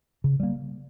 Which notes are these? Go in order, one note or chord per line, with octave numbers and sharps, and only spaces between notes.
C#3
G3 A#3